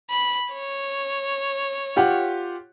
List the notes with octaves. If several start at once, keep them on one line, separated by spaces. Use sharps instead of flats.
B5
C#5
F4 G4 F#5